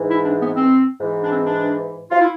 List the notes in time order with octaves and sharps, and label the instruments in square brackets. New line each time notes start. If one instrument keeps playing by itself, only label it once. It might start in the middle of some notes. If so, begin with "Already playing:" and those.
Already playing: [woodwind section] G#2 E3
E4
D4
B3
C4
G#2 E3
D4
C4
D4
F4
E4